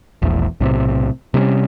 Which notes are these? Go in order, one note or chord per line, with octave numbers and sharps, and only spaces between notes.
E1 A#1 E2
B1 A2 C3
C3 G3 A#3 C#4